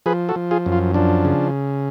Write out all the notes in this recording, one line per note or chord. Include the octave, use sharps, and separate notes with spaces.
F3 G#4 B4
F#4 A4
F3
F4 G#4
F#2
F4
F3 D4
C#3